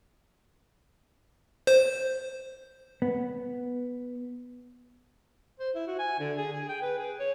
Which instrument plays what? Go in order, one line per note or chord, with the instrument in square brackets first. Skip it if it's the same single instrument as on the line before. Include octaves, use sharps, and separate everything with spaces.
[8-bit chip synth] C5
[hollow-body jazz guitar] B3
[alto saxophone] C5
E4
F#4
G#5
D3
G#4
G#4
G5
B4
G#4
C#5